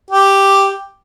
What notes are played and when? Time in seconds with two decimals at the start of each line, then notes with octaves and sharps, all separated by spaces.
0.11 G4